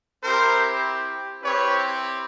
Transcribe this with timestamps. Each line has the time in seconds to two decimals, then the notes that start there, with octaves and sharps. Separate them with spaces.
0.23 C4 E4 G4 A#4 C5
1.42 C4 E4 G4 B4 C#5